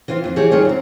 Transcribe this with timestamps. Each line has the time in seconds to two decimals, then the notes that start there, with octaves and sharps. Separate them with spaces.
0.08 E3 C4 F4
0.24 F2 F4
0.36 E3 G4 G#4 C#5
0.51 D#3 G3 F4 G#4 C#5
0.65 F#2 C4